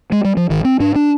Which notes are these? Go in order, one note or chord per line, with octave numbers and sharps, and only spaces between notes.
G#3
G3
F3
G#1 D#3
C4
G#2 D4
D4